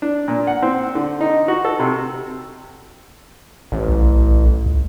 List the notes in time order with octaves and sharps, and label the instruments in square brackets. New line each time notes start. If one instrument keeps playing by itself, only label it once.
[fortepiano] D4
A#2
F#5
C4
D3
D#4
F#4
A4
C3
[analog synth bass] A1
[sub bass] B1
C#2